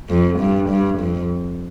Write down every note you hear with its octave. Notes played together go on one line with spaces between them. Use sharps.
F2
G2
G2
F2